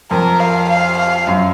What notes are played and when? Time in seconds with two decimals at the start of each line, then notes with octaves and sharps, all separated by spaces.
0.11 F2 A#4
0.40 F5
0.70 F5
0.98 F5
1.27 F#2